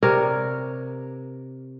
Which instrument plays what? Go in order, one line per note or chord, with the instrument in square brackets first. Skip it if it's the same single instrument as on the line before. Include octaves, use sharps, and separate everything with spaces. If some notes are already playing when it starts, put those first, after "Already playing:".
[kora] C3 A#4 C#5 D5